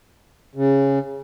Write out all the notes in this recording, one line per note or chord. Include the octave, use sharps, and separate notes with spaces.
C#3